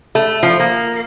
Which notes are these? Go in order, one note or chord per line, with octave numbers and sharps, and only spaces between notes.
A3
F3
A#3